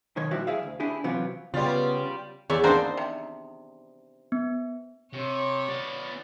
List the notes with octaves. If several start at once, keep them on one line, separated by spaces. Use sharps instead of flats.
B1 D#3 C#5
A#2 F3 G3 E4 F#4 G4
E4 G#4 E5 F5
D2
D4 E4 G4 G#4
C3 E3 F#3 B3 F4
C#3 G3 B3 F4
E2 C#5 D5 E5
A#3 C4 D4 D#4 C5
C3
B3
C3 C#5
B3 D5